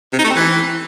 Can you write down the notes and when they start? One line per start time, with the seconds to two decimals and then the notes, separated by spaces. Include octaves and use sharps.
0.13 C3
0.19 D#4
0.24 A3
0.30 C4
0.36 E3